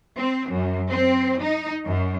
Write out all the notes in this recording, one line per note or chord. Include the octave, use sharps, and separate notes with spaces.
C4
F#2
C4
D#4
F#2